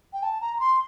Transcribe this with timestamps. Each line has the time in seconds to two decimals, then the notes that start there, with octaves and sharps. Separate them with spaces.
0.13 G5
0.23 A5
0.41 A#5
0.57 A#5
0.60 C6